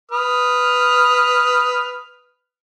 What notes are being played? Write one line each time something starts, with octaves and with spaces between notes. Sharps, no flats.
B4 D#6 F6